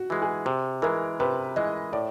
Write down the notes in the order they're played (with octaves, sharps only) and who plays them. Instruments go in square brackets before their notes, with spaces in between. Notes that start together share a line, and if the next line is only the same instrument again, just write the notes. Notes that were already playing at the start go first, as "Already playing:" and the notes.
Already playing: [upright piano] F#4
[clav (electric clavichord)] E3 G#3
[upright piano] G#4
[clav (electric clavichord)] C3
[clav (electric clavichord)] E3 G#3 [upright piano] A#4
[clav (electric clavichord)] C3 [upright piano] B4
[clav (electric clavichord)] E3 G#3 [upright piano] D#5
[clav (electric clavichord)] A2 [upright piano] D5